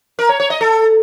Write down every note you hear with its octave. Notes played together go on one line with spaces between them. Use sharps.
A#4
C#5
C#5
D#5
A4